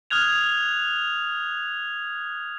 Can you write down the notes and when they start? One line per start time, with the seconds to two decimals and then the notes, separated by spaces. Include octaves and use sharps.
0.10 D#6 F6 F#6 G#6 F7